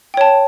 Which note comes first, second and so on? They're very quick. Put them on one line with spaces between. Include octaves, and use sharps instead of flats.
G5 C#5 A5